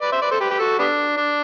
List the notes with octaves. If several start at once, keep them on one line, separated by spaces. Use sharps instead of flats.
B4 D5
C5 E5
B4 D5
A4 C5
G4 B4
G4
F#4 A4
G3 B3 D4
D4